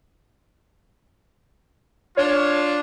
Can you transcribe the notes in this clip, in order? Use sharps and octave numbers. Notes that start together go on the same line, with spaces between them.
D4 F4 C#5